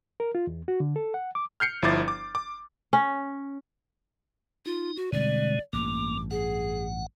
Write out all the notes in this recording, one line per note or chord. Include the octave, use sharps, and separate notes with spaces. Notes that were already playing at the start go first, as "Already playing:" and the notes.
A#4
F4
E2
F#4
D3
A4
F#5
D6
F6 G6 C7 C#7
G1 F3 E4 D6 A6
D6
D6
C#4
D#4 F4
F#4
B2 D3 G3 G#3 C4 D5
A1 G2 A#3 D6
G#4 F#5